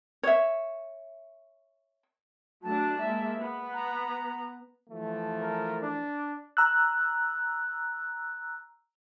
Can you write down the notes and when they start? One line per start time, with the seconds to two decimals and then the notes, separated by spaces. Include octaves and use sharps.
0.23 C#5 E5
2.63 F#3 A3 D4 A5
3.00 G#3 A#3 E5
3.37 B3
3.74 A#5
4.90 E3 F3 A3
5.41 A#4
5.82 D4
6.57 A#5 E6 F#6